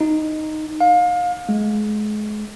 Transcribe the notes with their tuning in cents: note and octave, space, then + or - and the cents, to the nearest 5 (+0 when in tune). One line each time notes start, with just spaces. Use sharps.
D#4 -5
F5 +30
G#3 +30